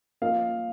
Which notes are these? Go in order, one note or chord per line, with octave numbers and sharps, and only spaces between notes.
F3 A#3 F4 A#4 D#5 F5